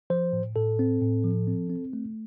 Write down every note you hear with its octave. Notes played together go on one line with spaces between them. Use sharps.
F3 C5
A2
A2 A4
C4
A2
F3
C4
C4
A3